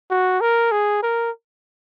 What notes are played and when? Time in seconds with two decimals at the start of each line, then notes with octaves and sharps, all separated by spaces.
0.10 F#4
0.41 A#4
0.72 G#4
1.03 A#4